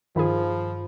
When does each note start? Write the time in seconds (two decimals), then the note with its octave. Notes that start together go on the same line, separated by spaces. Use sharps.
0.16 G2 D#3 F3 F4 G#4 B5